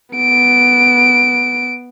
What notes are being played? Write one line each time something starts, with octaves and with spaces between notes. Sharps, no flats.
B3 D7